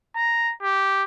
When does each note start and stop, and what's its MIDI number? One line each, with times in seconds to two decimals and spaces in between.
0.16 0.53 82
0.62 1.03 67